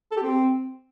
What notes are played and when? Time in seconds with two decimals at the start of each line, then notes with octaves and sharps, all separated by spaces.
0.12 A4
0.17 G4
0.22 C4